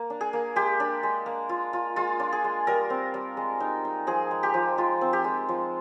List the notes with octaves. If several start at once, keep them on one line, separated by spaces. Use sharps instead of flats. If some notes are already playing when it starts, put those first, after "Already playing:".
Already playing: A#3
D4
G#4
A#3
G#3 G4
D4
G#3
A#3
F4
F4
G#3 F4
D4
G#4
G#3
G3 A#4
C4
G3
G#3
D#4
D#4
F3 G#4
G#3
G4
F3
G#3 F4
C4
G4
G#3
F3